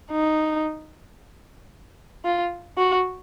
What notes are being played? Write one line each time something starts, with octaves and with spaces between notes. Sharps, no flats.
D#4
F4
F#4